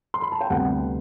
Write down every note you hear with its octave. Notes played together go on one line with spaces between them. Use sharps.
C6
B5
A5
G5
D2 C3 G3 B3 F#5